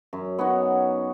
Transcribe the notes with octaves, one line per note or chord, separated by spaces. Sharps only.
F#2
B3 C#4 D#4 F#4